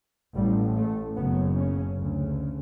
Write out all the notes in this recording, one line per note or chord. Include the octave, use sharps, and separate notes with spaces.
A1 A2 G3
A3
F#1 F#2 C#3 B3
C#4
D2 C#3